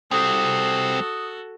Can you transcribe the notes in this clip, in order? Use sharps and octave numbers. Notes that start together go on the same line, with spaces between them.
G3 C4 F#4 A4 D#6